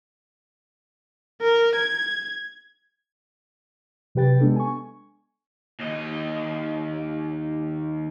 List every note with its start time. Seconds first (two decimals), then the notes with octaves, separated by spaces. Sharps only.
1.41 A#4
1.76 G#6
4.15 C3 F#3 G4 B4 G5 A6
4.40 G#3 B3 D4 A4
4.56 G#5 C#6
5.80 D#2 D#5